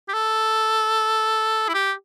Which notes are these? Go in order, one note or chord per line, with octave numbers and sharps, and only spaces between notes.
G4
A4
E4
G4